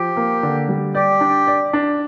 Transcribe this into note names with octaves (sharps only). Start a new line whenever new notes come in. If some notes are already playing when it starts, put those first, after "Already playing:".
Already playing: F3 G4
A#3
D3
G3
G4 D5
D4
D5
D4